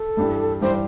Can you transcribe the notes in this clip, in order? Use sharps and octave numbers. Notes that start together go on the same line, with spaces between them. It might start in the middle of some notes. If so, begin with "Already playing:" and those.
Already playing: A4
G2 E3 G3 D4 G4
G2 E3 G3 D4 G4 C5